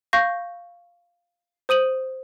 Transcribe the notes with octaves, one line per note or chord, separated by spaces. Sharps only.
F5 C#6 G6 A#6
C5 D#6 D#7 F#7